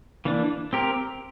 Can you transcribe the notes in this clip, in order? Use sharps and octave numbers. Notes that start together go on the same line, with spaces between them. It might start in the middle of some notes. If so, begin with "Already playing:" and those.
E3 A#3 D4
C4 G4 A#4